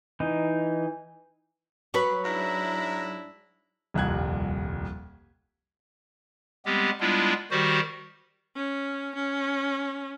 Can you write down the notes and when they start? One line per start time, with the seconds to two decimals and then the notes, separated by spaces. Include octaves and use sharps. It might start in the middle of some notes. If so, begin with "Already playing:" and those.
0.20 E3 D#4
1.94 F#3 B4 B5 C#6
2.24 G#2 D4 E4 A#5
3.94 D#1 C2 F2 F#6 G#6
6.66 G3 G#3 B3 C4 G4
7.00 G3 G#3 B3 D4 E4 F4
7.51 D#3 G3 F#4 G4 C5
8.56 C#4
9.15 C#4